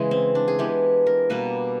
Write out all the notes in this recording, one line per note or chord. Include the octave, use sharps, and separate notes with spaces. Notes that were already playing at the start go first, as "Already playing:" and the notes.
Already playing: C#3 E3 G#3
C4
D4
G#4
E3 G#3 B3 G4
A#4
B2 G3 A#3 B4